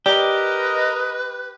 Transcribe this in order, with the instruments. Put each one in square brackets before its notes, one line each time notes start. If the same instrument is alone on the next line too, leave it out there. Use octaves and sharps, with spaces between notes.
[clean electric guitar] G4 [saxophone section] A#4 D#5 [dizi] B4 [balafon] D5